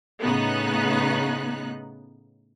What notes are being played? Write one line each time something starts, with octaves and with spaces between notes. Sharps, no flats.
A2 C#3 B3 D#4 F#6